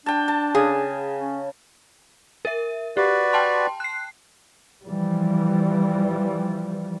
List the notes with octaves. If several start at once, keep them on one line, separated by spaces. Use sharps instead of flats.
D4 G5 A5
A5
C#3 G#4
C#4
A#4 E5
F#4 G4 B4 D5
G5 A5 C6
F#6 C7
E3 F3 G3